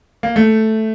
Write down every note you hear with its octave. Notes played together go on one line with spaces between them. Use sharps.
A#3
A3